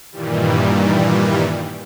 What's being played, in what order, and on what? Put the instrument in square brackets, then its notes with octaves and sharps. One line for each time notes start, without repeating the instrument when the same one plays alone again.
[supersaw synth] G2 A#2 D#3 E3 G3